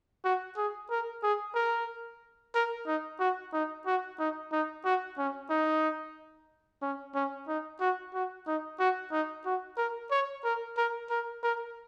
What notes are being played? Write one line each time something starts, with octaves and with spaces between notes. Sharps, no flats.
F#4
G#4
A#4
G#4
A#4
A#4
D#4
F#4
D#4
F#4
D#4
D#4
F#4
C#4
D#4
C#4
C#4
D#4
F#4
F#4
D#4
F#4
D#4
F#4
A#4
C#5
A#4
A#4
A#4
A#4